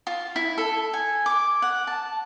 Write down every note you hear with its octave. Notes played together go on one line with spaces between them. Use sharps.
F4
E4
A4
G#5
D6
F#5
A5